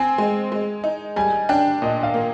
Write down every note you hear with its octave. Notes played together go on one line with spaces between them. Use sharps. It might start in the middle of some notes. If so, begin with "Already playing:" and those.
Already playing: C4 G#5
G#3
G#3
D#4
G3 G#5
D4 G5
A#2 D#5
F5
A#3